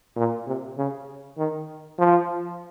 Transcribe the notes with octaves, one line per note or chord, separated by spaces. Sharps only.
A#2
C3
C#3
D#3
F3